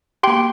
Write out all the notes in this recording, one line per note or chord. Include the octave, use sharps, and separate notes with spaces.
A#3 G4 G5 C6